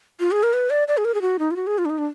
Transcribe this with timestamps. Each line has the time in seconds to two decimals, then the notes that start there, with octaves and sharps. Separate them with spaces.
0.20 F4
0.31 G#4
0.43 A#4
0.53 B4
0.70 D5
0.88 D5
0.97 G#4
1.05 A#4
1.14 G#4
1.22 F#4
1.39 D#4
1.51 F4
1.56 F#4
1.67 G#4
1.78 F4
1.85 D4
1.90 D#4
1.98 D4